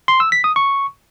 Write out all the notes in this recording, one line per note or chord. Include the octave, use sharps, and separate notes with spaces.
C6
E6
B6
D#6
C#6